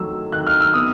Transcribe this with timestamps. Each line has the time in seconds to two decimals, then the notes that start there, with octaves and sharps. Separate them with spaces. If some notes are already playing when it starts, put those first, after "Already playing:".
Already playing: D#3 F#3 A3 E6
0.32 D#3 F#6
0.47 F6
0.60 E6
0.74 B3 D#6